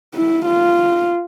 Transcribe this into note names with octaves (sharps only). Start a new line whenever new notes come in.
E4
F4